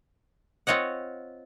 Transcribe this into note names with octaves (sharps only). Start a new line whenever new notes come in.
C4 F4 C#5 D#5 F#5